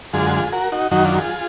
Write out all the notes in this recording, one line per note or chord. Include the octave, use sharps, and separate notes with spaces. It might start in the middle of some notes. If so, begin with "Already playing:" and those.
F#2 D3 G#3 F4 G#4
G#4
F#4 A#4
D#4 F#4
F#2 D#3 F#3 D#4 F#4
D4 F4
F4 G#4